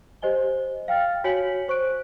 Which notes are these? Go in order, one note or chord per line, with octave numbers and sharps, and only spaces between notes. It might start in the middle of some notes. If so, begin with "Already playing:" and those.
G4 C5 D#5 G#5 G7
F5 G5 F6 A6
F#4 C#5 G#5 B6 C#7 F#7
C5 C#6 F#6 D7